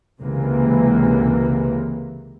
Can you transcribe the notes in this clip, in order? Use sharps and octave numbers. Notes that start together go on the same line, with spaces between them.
C#2 C3 E3 A#3